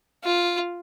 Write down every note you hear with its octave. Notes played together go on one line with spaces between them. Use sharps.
F4